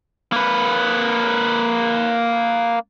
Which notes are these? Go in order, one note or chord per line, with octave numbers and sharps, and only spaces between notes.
A#3 B4